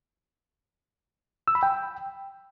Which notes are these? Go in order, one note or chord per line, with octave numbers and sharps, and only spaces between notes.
E6
B5
G5